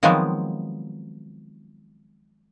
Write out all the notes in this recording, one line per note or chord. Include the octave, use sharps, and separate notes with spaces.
D#3 F3 F#3 G#3 B3 C4